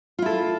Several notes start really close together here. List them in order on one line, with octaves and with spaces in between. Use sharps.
F4 E4 A4